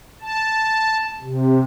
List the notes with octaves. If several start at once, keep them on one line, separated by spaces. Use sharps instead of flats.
A5
C3